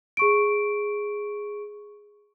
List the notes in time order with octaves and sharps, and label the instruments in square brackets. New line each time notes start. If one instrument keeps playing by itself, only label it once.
[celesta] G#4 C#6 D7